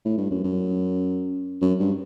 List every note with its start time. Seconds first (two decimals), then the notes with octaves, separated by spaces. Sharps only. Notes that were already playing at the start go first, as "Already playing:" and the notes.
0.05 A2
0.17 G2
0.31 F#2
0.44 F#2
1.61 F#2
1.79 G2